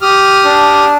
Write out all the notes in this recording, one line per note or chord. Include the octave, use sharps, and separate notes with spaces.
G4 D#6 F6
D4